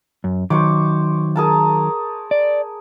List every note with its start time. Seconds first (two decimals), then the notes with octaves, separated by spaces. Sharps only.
0.24 F#2
0.50 D#3 F#3 C5 C#5 D6
1.36 G#4 A#4 A5
2.31 D5